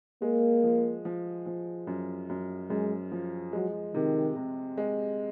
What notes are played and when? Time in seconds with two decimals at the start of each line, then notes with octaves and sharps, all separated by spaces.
0.22 G#3 A#3
0.64 F3
1.05 F3
1.46 F3
1.87 F#2
2.29 F#2
2.70 F#2 G#3
3.12 F3
3.53 F#3 G#3
3.95 C3 D#3
4.36 C3
4.77 G#3